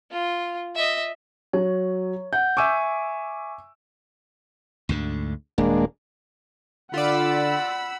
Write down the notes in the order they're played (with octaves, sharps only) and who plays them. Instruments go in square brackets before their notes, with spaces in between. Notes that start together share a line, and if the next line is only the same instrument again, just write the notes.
[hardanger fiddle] F4
D#5 E5
[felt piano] F#3 [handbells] C#5
[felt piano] F#5 [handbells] G6
[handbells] E5 G#5 C#6 [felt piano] D6 E6
[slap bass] D2 G#2 D3
[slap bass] D#1 [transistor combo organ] G#3 A#3 D4
[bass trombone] D3 [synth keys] F4 D5 [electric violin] F#5 [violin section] B5 E6